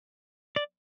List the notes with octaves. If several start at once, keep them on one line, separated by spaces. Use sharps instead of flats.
D5